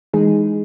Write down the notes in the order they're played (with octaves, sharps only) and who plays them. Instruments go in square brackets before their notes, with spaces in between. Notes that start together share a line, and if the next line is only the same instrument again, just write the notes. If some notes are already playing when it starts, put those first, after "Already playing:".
[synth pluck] E3 G#3 D#4 G#4